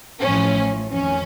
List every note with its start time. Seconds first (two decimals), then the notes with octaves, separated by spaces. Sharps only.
0.21 A1 A2 F3 C#4
0.92 F2 D#3 C#4